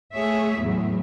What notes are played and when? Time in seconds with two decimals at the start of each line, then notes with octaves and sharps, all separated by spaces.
0.14 A3 G#4 C#5 E5
0.60 E2 A2 F#3